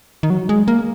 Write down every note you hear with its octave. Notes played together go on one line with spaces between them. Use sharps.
D#3
F#3
G#3
A#3